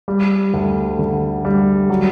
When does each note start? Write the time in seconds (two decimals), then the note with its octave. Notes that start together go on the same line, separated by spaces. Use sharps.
0.08 G3
0.54 D2
0.99 D3
1.45 G3
1.90 F#3